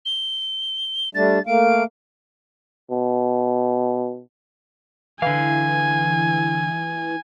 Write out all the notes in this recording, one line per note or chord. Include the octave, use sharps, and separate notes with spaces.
G7
G3 A3 D4 A6
A3 A#3 F5 D7
B2
D3 E3 F5 G#5